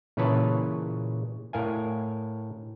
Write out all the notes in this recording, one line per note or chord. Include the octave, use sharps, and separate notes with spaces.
A#2 C#3 E3 B4 C#5 A5
A2 A#4 F5 G#5